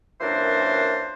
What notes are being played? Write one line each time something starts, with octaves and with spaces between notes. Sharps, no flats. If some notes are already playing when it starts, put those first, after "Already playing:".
F#2 A#2 E3 D4 A#4 C5